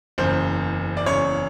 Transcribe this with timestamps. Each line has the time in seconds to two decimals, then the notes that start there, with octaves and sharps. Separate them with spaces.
0.18 F#1 E2 C#3 C5
0.97 D5
1.06 F#1 E2 C#3 C#5